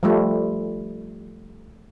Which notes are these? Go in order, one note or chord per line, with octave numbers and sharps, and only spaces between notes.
F3 G3 A3